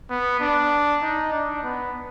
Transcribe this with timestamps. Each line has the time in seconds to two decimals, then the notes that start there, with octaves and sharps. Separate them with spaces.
0.10 B3
0.40 D4
1.02 D#4
1.32 D4
1.63 B3